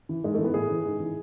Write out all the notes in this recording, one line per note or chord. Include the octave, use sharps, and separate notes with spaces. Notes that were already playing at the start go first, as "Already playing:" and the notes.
E3
G#2 G#3
A3
E3
B3
A2 G#4
E3
G#2
E3